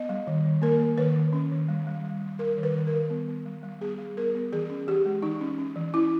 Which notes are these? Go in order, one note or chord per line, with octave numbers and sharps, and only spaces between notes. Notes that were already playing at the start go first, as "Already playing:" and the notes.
Already playing: B3 D#5
G3
D#3
D#3
A#3 A#4
A#3
D#3 B4
D#3
C#4
D#3
G3
G3
G3
G3
G3 A#4
D#3
B4
D#3
A#4
G3
B3
B3
G3
G3
B3 G#4
G3
B3 A#4
B3
E3 G#4
C#4
E3 G4
G#3
E3 D#4
C#4
C#4
E3
C#4 E4